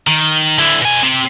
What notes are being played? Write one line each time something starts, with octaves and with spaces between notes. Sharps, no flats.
D#3
D3 E4
B2 G#5
C4 G4